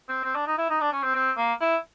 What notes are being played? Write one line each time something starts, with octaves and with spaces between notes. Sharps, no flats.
C4
C4
D4
D#4
E4
D#4
D4
C#4
C4
C4
A#3
E4